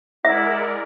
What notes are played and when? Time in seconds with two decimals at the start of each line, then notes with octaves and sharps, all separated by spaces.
0.25 G#3 E4 A#4 D5 E5 F#5